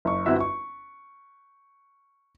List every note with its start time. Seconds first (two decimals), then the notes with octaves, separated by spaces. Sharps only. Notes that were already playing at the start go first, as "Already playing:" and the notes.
0.05 F#1 C#6
0.26 G1 C4 E4 F#4 E5
0.40 C#6